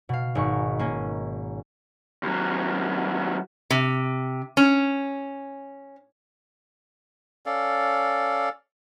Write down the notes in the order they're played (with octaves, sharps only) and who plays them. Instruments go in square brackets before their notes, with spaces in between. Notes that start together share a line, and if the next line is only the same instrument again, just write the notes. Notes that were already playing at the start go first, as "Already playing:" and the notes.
[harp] B2 F5
G#1 G#2 C#6
A#3 C#4
[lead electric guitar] D#2 F#3
[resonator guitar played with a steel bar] C3
C#4
[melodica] C#4 A4 D5 F5